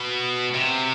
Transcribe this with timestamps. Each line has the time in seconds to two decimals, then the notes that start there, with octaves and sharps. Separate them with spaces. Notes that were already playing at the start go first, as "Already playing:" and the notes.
Already playing: B2
0.54 C3